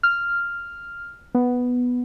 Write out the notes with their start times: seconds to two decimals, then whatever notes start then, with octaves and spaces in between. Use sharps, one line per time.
0.03 F6
1.35 B3